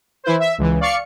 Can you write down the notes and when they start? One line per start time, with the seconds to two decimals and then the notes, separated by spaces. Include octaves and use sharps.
0.24 E3 E4 B4 C5
0.39 E5
0.58 C#2 E3
0.80 D5 F5 C#6 C#7